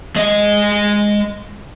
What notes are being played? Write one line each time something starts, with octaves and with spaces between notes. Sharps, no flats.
G#3 D#5